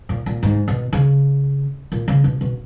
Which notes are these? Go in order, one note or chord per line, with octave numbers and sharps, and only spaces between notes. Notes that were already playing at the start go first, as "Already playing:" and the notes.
A#2
A#2
G#2
B2
C#3
A#2
C#3
B2
B2